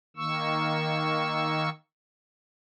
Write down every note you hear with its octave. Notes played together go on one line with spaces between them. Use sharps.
D#3 A#3 C#6 E6